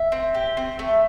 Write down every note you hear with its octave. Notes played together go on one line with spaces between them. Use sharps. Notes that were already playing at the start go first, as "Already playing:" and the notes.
Already playing: E5
C4
G4
C4
A3